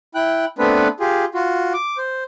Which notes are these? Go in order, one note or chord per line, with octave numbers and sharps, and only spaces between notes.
E4 G5 F#6
A3 B3 C4 D4 B4
F4 G4 G#4
F4 F#4
D6
C5